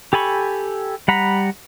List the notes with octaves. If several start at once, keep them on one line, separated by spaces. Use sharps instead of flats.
G4 A4 G#5 B5 C#6
G3 F#5 A#5 B5